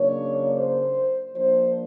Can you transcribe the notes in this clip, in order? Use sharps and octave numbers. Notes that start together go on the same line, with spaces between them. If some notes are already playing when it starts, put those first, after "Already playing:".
Already playing: C#3 F#3 A#3 D4 C#5
C5
F3 A#3 D4 C5